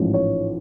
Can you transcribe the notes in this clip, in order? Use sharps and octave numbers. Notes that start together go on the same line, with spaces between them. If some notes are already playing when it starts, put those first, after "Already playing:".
Already playing: A1 G#2 F3
C#5